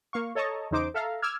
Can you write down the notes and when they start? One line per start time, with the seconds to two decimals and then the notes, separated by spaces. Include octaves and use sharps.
0.13 A#3 F5 C#6
0.35 A4 C#5 D#5 A5 A#5 C#6
0.71 E2 C#3 D#4 C5 D6 D7
0.94 A4 E5 F5 A#5
1.22 D6 E6 F6 G#6